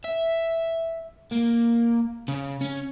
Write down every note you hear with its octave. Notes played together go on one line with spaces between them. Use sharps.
E5
A#3
C#3
C#4